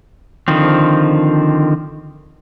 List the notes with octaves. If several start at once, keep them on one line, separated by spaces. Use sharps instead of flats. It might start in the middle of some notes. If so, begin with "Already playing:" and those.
D3 D#3 F3 C4